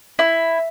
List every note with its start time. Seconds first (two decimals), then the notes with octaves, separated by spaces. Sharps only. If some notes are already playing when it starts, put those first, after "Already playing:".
0.19 E4